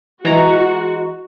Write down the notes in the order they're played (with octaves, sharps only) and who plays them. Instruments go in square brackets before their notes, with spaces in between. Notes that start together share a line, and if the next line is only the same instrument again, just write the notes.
[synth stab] E3 A#5 [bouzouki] G#3 B4 D#5 [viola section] F#4